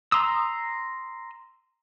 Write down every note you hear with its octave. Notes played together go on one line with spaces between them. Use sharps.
A#5 C6 D#6 E6